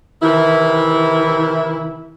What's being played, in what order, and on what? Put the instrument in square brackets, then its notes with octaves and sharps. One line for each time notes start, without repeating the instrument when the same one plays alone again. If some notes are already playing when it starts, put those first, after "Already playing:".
[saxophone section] C3 D#3 E3 E4